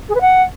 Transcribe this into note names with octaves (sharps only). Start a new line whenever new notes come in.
G#4
B4
F#5